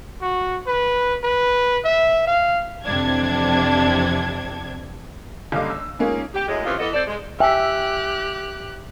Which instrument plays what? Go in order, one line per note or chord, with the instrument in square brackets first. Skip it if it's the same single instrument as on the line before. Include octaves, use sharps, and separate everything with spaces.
[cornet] F#4
B4
B4
E5
F5
[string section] F2 C3 E3 D4 G#6
[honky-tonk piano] F#1 D3 G3 D#5 F5 D6
E6
G#3 A#3 C#4 D#4 F4
[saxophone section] G4
F#2 A2 G#3
C3 D#3 E3 C#4 F4
E3 B3 A4 D#5
C4 A4 D5
G#3
[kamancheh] G4 F#6 [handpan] E5 [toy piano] G5 G#5